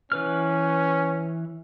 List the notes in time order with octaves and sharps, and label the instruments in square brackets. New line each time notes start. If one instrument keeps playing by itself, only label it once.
[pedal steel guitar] E3 B4 F6 [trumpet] C#4